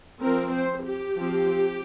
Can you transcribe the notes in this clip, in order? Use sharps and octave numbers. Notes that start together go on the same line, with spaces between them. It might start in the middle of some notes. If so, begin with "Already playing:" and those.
F3 C4 A#4
C5
G4
F3 C4